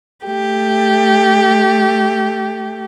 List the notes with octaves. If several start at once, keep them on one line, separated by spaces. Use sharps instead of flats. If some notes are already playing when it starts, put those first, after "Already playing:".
A3 G4